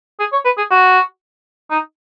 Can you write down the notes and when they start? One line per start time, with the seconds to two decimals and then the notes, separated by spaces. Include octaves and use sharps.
0.20 G#4
0.32 C#5
0.45 B4
0.58 G#4
0.70 F#4
1.71 D#4